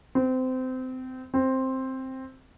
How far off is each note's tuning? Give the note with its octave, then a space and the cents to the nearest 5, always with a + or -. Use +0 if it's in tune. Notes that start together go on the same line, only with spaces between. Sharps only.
C4 -25
C4 +5